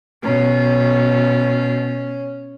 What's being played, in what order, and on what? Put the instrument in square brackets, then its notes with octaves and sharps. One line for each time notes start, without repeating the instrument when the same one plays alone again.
[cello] B2 [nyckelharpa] C#4